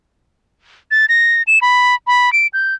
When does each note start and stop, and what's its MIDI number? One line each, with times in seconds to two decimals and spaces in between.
0.91 1.06 93
1.09 1.43 94
1.47 1.59 100
1.62 1.95 83
2.07 2.32 83
2.33 2.47 98
2.53 2.74 91